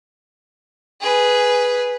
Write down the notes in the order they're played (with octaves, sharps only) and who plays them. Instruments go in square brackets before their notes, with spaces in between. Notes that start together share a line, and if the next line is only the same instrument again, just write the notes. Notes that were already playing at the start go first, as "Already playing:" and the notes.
[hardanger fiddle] G#4 B4